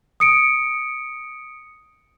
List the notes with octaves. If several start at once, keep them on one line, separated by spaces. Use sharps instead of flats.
D#6 C#7 D7